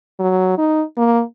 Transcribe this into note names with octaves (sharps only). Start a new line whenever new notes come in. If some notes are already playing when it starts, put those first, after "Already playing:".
F#3
D#4
A#3